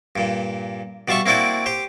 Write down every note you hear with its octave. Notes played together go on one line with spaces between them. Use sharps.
G2 A#2
B2 G3 F4 E5 C#6
A#3 C4 E4 F#4 D5 G5
G4 C5